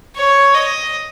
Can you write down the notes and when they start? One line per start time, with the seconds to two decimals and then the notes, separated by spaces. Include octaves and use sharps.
0.16 C#5
0.54 D#5